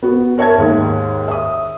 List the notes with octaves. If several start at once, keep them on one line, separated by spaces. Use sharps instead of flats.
B3 F#4
A#4 C#5 E5 A5 G#6
D#2 G#2
E5 D#6